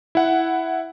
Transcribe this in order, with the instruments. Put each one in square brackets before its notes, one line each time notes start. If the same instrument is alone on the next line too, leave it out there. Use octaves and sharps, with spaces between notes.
[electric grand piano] E4 F#5